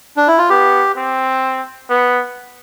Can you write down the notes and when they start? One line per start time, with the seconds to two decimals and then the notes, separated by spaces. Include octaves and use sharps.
0.17 D4
0.28 E4
0.38 F4
0.50 B3 G4
0.97 C4
1.90 B3